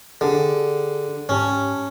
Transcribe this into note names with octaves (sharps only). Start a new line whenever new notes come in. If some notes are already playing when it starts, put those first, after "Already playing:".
D3 D4 G4 G#4
G#2 C#4 G4 A5